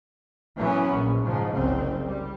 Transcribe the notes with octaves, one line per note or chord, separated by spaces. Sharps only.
E3 F#3 B3 C#4
A#1
G#2 C#3 F3
F#1 C2 C#3 C4
G3